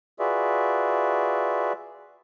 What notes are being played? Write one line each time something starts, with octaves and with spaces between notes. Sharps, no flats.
F4 F#4 G#4 B4 D5 E5